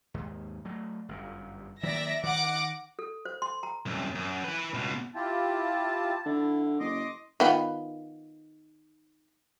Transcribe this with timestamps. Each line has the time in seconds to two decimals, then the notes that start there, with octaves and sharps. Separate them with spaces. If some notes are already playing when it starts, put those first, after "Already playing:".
0.14 D#2 G#2
0.65 F#3 A3
1.09 G1 F#2
1.83 D#3 F#3 A#3 D5 E5 A#6
2.23 D#3 F#5 D6 A#6
2.99 A4
3.25 C5
3.42 C6
3.63 A#5
3.86 C2 F#2
4.15 F#2
4.44 E4 B4
4.74 C#2 B2
5.15 E4 F4 G4 A5
6.26 D3 E4
6.80 F#1 D#5 C6 D6
7.40 D#3 B3 F4